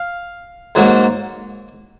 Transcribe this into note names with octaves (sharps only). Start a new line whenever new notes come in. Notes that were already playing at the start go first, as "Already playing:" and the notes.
Already playing: F5
G#2 F#3 A#3